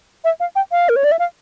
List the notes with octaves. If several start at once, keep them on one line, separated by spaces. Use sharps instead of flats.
E5
F5
G5
F5
A#4
C#5
D5
E5
F5